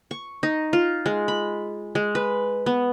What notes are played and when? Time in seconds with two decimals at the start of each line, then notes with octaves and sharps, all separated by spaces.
0.11 C#6
0.43 D#4
0.73 F4
1.06 G#3
1.28 B5
1.95 G#3
2.15 B4
2.66 B3